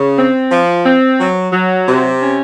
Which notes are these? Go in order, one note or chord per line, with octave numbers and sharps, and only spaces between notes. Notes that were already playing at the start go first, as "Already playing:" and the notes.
Already playing: C#3
C4
F3
C4
F#3
F#3
C3
C#4